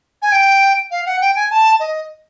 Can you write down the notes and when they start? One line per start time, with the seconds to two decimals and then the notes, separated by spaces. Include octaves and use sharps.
0.22 G#5
0.32 G5
0.91 F5
1.06 F#5
1.21 G5
1.36 G#5
1.51 A5
1.80 D#5